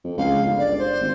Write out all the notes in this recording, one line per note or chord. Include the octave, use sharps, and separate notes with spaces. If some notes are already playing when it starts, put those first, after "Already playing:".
F2
C#2 F5
G1
D5
C5
G#1